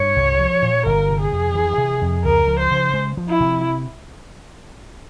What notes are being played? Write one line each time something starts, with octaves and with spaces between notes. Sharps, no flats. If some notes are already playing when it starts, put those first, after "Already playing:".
Already playing: G2 C#5
C2
F3
A#2
G1 A#4
C3
G#4
F2
E3
C3
F2
C#2 A#4
F3
C5
C#3
G#3
F3
E4
C3